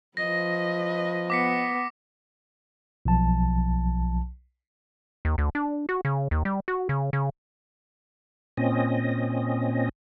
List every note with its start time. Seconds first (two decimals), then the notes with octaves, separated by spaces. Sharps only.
0.17 F3 B4 D#5 A#6
1.30 B3 D6 B6 C#7
3.05 B1 F3 A5
5.25 D#2
5.38 D2
5.55 D4
5.89 F#4
6.05 C#3
6.31 D#2
6.45 G3
6.68 F#4
6.89 C#3
7.13 C#3
8.57 A#2 C4 C#4 D#5